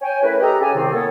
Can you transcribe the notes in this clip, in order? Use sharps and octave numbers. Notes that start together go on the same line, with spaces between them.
C#5 G5 G#5
A3 C#4 E4 A#4 B4
G4 A4 D#5 A#5
C#3 G4 A4 G#5
C2 C3 D#3 C4
A#3 B3 A4 C#5